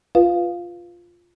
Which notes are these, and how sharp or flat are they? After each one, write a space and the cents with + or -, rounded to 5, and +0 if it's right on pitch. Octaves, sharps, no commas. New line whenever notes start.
F4 +0 B4 +0 F5 +0